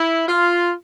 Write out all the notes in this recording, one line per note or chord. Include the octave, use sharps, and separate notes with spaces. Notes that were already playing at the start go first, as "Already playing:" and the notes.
Already playing: E4
F4